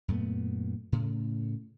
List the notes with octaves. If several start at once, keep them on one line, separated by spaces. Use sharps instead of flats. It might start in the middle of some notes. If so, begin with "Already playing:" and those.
F#2 A#2 A3 B3
A2 C#3